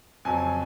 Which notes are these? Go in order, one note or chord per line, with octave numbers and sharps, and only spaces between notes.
F2 C#3 F#3 G#5